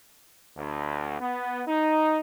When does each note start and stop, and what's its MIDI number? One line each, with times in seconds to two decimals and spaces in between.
0.57 1.17 38
1.20 1.62 59
1.67 2.20 63